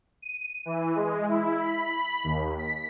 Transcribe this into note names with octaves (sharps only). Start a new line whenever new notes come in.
D#7
E3
G#3
E4
B5
D#2
B6